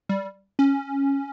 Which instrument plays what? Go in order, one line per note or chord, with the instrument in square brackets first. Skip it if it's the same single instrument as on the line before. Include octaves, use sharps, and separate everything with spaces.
[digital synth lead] G3
C#4